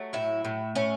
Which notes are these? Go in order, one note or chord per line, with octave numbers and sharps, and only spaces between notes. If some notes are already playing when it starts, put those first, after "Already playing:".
Already playing: F#3 A3
A2 E4
A2
A3 C#4